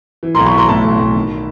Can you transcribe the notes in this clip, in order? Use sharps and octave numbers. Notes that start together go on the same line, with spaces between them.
E3
A#5 C6
B1
B5 C#6
E3 A#5 C6
A2 A5 B5
B1
B1
D#3